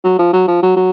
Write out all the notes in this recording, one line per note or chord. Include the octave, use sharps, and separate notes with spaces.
F#3
F3
F#3
F3
F#3
F#3